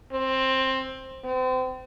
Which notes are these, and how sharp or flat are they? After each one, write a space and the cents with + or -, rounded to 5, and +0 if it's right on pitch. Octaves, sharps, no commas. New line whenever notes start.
C4 +15
C4 -35